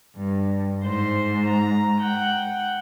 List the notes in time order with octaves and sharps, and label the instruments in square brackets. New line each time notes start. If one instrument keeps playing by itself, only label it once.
[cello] G2
[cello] G#2 [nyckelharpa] C5
[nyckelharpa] A#5
F#5 G5